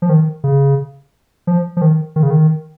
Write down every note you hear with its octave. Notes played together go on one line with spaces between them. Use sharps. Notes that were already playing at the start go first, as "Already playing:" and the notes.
F3
D#3
C#3
F3
F3
D#3
D#3
C#3
D#3